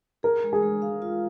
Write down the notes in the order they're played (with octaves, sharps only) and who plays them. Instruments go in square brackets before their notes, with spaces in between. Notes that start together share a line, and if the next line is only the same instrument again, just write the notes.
[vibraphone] G#4 [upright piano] A#4
[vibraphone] G#3
[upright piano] G#4
[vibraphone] G#3
F5
F4